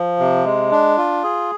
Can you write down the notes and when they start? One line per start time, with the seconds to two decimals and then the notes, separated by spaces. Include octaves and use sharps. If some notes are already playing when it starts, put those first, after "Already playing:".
Already playing: F3
0.19 C3
0.45 G#3
0.71 D4
0.97 F4
1.23 G#4